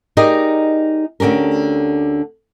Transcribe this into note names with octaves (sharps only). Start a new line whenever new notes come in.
D#4 G4 G#4 A#4 D5 D#5
D2 D3 C#4 G4 A#4